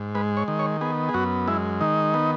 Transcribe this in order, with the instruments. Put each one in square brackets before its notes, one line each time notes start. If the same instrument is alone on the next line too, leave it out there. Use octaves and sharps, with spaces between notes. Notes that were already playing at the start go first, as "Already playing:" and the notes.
Already playing: [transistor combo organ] G#2
G#3 B4
C#5
D#3
C#5
B3 G#4
G#4
F#2 F#4
G#3 E4
D#3 D#4
B3